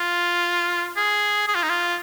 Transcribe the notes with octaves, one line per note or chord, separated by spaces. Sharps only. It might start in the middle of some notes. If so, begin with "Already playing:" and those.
Already playing: F4
G#4
G#4
F4
D#4
F4